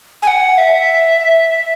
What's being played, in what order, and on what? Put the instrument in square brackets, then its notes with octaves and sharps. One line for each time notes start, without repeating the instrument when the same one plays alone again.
[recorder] G#5
F#5
E5